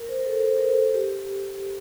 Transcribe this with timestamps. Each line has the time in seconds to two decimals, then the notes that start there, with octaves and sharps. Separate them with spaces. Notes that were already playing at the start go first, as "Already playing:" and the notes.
Already playing: A#4
0.09 C5
0.19 A#4
0.26 A4
0.45 C5
0.57 A#4
0.69 A4
0.94 G4